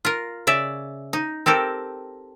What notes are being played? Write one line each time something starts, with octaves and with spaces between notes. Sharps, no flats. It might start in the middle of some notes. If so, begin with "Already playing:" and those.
F4 A#4
C#3 D5 E5
D#4
C4 G4 A4 A#4